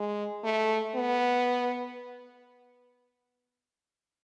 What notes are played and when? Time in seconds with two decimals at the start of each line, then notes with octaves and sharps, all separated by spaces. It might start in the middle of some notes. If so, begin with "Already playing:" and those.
Already playing: G#3
0.44 A3
0.95 B3